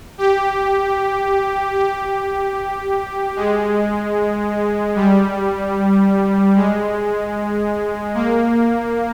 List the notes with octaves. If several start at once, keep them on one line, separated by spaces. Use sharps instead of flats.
G4
G4
G#3
G3
G#3
A#3